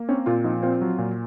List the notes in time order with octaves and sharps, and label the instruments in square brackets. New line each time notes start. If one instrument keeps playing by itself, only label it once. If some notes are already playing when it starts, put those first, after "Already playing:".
Already playing: [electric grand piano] A#3
[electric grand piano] C4 [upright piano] C#4
[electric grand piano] A#2 [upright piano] F4
[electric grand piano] F3 [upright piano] D#4
[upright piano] C4 [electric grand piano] F4
[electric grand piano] F#3
A#2